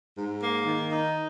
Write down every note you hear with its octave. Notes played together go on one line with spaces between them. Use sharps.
G#2
A#3
D#3
D#4